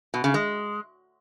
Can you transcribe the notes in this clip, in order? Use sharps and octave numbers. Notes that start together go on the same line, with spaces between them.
B2
C#3
G#3